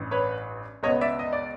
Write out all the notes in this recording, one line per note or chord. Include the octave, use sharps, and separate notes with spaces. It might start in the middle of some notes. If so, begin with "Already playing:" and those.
Already playing: A1 G2 E3
B4 C#5
C#2 B2 G#3 B3 C#5 D#5
D5 E5
D#5
D5